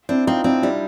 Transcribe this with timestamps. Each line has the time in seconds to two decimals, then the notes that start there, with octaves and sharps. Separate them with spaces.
0.09 C4 D4 E4
0.27 C4 D#4 F4
0.44 C4 D4 E4
0.62 G3 D4 E4